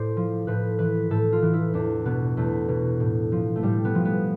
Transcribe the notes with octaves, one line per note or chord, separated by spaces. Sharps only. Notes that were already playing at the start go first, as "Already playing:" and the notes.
Already playing: A2 C5 D5
F3
A2 B4
E3 B4
A2 A4
F4
E3
E4
E2 D4
B2 B3
E2 A3
B2
A2
F3
A3
A2 G3
B3
F3
B3